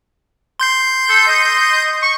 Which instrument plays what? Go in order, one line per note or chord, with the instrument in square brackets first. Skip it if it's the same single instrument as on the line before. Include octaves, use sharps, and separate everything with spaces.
[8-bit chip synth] C6 G6 C7
[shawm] A4
D#5
C#6